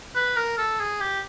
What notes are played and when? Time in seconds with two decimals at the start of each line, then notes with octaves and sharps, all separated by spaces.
0.15 B4
0.36 A#4
0.58 A4
0.79 G#4
1.01 G4